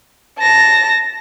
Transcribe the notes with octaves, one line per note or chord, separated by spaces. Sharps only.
A5 A#6